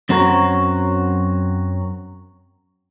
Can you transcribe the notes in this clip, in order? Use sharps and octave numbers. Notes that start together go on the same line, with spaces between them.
F#2 C4 F#4 A#4 C#5